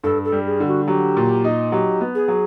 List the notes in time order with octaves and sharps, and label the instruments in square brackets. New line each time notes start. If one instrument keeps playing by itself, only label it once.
[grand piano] G2 [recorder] A4
[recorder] A4
[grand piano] G3
[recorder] G#4
[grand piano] D3
[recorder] F#4
[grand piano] F#3 [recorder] G4
[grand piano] A#2
D#4
[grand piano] F#3 [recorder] G4
[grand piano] B3
[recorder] G#4
[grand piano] F#3